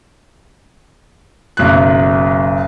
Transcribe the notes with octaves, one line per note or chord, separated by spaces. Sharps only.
F#1 B1 F#6